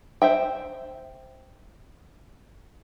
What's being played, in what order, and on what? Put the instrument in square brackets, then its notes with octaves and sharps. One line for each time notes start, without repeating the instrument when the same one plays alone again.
[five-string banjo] C5 E5 G5